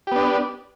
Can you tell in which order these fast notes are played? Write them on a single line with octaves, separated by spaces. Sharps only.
G4 B3 D4